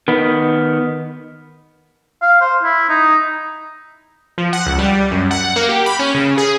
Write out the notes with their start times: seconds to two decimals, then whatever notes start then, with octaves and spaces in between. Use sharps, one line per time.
0.08 D#3 B3
2.22 F5
2.41 C5
2.63 E4
2.89 D#4
4.38 F3
4.53 F#5
4.66 C#2
4.78 G3
5.11 F#2
5.31 F#5
5.56 A#3
5.69 G4
5.86 B5
5.99 C#4
6.14 C#3
6.38 G#4